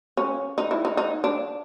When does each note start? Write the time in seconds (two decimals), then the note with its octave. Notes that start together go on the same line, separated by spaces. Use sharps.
0.17 C#4
0.58 D#4
0.71 E4
0.85 D#4
0.97 D#4
1.24 D4